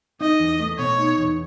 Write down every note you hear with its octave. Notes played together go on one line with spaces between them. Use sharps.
D#4 D#5
E2
A3
B2 C#5
D#4
E2